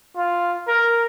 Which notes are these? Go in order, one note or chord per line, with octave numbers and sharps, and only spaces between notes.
F4
A#4